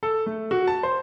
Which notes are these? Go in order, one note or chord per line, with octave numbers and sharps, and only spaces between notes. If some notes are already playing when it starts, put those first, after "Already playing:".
A4
A3
F#4
A5
C5